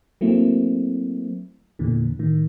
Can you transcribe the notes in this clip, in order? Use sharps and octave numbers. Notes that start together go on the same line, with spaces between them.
F#3 A3 A#3 C4 E4
E2 A#2 D3 E3
A2 D#3